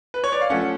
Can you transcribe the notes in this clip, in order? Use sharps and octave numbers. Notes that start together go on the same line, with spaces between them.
B4
C#5
D5
F5
F3 A3 C#4 F#5